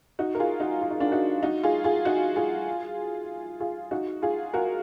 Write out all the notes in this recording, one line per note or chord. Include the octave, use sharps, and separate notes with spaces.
D#4 F#4
A#4
F4 G#4
D#4 F#4
F4
D#4
D4 F4
D#4 F#4
D#4 F#4
F4 G#4
F4 G#4
D#4 F#4
F4 G#4
F4 G#4
D#4 F#4
F4 G#4
F#4 A#4